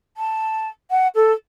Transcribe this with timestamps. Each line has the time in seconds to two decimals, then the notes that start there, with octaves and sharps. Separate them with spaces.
0.17 A5
0.90 F#5
1.15 A4